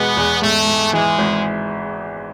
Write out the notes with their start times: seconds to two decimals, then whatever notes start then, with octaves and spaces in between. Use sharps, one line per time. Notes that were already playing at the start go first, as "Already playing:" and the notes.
Already playing: E2 B2 G#3 B3
0.17 E2
0.42 G#2 A3
0.67 G#2
0.93 E3 G#3
1.18 G#1